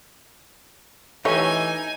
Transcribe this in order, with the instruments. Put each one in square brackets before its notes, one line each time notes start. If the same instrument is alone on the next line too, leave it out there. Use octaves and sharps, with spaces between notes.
[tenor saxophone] E3 [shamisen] A3 G4 C#5 [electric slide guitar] D#4 [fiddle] G#5